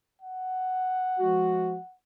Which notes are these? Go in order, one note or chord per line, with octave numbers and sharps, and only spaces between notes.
F#5
F3 G#3 F#4